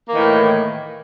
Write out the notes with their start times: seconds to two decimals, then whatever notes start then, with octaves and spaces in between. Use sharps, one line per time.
0.09 A#3
0.11 E3
0.14 D#3
0.17 A2